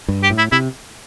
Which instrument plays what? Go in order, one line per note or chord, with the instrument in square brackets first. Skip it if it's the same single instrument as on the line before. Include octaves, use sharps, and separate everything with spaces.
[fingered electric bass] G2
[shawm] G4
[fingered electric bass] A2
[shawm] E4
[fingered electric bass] C3 [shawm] E4